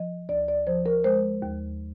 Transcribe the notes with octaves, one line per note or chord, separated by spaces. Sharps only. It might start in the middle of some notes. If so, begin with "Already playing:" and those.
Already playing: F3 D#5
D2 D5
D5
F3 C5
A#4
G#3 C5
D#2